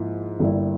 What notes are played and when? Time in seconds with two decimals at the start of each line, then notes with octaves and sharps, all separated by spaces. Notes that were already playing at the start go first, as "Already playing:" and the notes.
Already playing: G#2 F3 A#3 E4
0.39 G1 G2 G3 A#3 E4